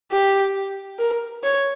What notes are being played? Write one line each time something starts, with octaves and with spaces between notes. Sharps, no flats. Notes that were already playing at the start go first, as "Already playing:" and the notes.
G4
A#4
C#5